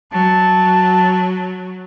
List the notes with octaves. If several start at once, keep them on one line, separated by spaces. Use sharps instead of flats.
F#3 A5